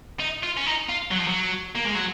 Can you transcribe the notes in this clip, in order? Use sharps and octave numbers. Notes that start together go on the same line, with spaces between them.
D#4
F4
C#4
D#4
F4
F#3
F3
F#3
A#3
G#3
F#3